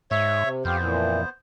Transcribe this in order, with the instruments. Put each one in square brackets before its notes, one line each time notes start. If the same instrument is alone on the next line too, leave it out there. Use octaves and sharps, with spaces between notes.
[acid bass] G#2 [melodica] C#5 E5
[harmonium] C3
[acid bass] F2 [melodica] B3 C5 [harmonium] G4 F5
[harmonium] A#2 E3